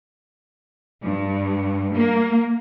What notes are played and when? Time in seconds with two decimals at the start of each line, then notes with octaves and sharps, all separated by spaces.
1.03 G2
1.95 A#3